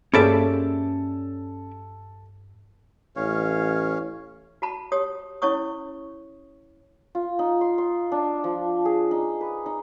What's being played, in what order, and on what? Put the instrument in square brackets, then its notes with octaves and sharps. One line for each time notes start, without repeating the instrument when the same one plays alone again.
[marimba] G2 [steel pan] A#3 G#4 C5 [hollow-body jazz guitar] C#4 D5 E5 [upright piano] A4
[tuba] A1 [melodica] C#4 C#5 F5
[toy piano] F#4 A5 B5
G4 C#5 D#6
C#4 E4 C#5 C#6 D#6
[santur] F4
D#4
C6
C6
D4
F3
G#4
D#4
B4
D#4